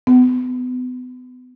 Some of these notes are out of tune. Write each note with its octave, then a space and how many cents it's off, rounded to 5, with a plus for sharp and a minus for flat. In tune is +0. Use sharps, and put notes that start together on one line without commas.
B3 +30